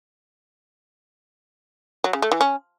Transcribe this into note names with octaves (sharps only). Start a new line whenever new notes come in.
F#3
C#3
A3
E3
C#4